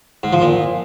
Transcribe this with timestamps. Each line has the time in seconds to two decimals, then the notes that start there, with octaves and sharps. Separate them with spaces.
0.23 G#2
0.33 F3
0.42 A#2